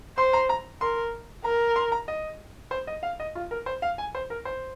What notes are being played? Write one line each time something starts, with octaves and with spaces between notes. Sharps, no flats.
C5 C6
A#5
A#5
A#4 C6
A#4 A#5
C6
A#5
D#5
C5
D#5
F5
D#5
F4
A#4
C5
F5
G#5
C5
A#4
C5